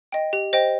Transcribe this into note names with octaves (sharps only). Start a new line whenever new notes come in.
D#5 G5
G4
C5 D#5 G5